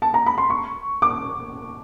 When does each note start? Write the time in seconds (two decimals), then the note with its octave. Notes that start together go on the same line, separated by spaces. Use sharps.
0.02 A5
0.14 A#5
0.26 B5
0.38 C6
0.50 C#6
1.02 D6